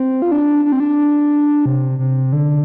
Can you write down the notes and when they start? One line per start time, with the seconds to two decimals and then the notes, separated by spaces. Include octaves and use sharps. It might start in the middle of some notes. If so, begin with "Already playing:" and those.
Already playing: C4
0.22 F4
0.32 D4
0.65 D4
0.72 C4
0.80 D4
1.66 C3
1.99 C3
2.33 D3